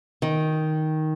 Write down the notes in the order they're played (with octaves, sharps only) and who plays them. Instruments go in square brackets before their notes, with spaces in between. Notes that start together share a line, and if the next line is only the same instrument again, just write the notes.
[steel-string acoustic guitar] D#3